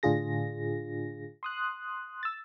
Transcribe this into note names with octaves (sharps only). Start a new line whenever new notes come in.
A2 D3 D4 F4 G#4 A#6
C6 D#6 F#6
E6 A6